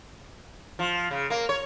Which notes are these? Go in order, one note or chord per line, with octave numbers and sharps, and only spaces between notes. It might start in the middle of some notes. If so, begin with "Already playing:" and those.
F3
C#3
A#3
C#5